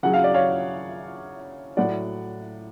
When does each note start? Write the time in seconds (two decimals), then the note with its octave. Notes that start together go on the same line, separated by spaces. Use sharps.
0.03 C#3 F#3 F#5
0.14 F5
0.24 D5
0.34 C#5 F5
1.77 A2 F#3 D5 F#5